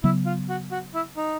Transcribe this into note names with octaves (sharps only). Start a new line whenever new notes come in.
C#3 F#3 B3 E4
F4
F#4
F#4
E4
D#4